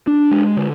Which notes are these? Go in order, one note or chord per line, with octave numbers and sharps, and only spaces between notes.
D4
G#3
D3